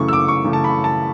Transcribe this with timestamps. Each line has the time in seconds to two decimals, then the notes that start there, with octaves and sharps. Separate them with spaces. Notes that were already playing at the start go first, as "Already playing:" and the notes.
Already playing: F#2 C#3 E3 A3 C#6
0.08 E6
0.13 D6
0.28 C#6
0.44 F#2 C#3 E3 A3
0.53 A5
0.64 B5
0.84 A5